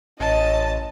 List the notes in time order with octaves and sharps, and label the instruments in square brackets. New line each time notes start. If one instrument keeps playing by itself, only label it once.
[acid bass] A1 [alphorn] C#4 [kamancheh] D#5 [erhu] A5